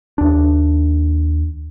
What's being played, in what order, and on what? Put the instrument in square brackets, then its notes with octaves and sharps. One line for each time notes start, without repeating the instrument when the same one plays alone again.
[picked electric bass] D#2 D4